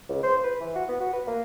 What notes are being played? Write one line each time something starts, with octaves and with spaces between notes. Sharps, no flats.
C#2
C5
B4
E3
F#4
B3
F#4
B4
A#3